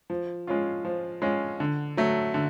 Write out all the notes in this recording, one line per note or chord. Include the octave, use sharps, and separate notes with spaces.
F3
G#3 C#4 F4
F3
G#3 C#4 F4
D3
F#3 A3
D3